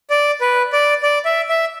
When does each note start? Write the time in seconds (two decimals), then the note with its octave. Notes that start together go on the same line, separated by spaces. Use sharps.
0.10 D5
0.41 B4
0.72 D5
1.03 D5
1.25 E5
1.49 E5